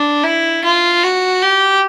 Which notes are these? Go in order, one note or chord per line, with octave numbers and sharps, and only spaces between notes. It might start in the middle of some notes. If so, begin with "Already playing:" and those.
Already playing: D4
E4
F4
F#4
G4